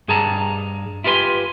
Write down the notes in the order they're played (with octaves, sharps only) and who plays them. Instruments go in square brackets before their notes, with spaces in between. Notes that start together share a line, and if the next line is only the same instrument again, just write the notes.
[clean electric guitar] G2 G#4 A5 A#5
E4 F4 G4 B4 G#5 C6